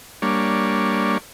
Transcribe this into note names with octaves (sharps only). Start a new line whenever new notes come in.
G3 A#3 D4 C#5